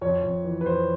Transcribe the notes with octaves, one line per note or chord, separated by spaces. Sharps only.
F2 C#5
F2
E3
B4
F2 C5